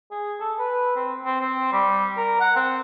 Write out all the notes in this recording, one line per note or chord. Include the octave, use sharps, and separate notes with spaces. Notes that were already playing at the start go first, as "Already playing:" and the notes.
G#4
A4
B4
C4
C4
C4
G3
A#4
F#5
C4